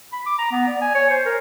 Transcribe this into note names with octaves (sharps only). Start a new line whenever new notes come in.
B5
D6
A#5
B3
D5
G#5
C#5
C5
A#4